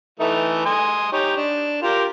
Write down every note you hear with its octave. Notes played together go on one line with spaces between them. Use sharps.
E3 A3 D#4
G#5 C6 D#6
D#4 G4 C#5
D4
F4 G4 A#4